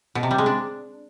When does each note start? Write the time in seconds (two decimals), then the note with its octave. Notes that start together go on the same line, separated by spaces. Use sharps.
0.15 B2
0.23 C3
0.31 G3
0.38 G#3
0.46 D4